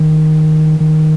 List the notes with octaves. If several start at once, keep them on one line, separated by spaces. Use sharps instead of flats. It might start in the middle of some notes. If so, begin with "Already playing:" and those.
Already playing: D#3
D#3